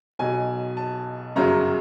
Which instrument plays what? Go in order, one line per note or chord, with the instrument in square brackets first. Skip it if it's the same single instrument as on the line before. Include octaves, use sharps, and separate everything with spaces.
[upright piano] B1 B2 F#3 G#5
A5
G1 F#2 C#3 F#3 A#5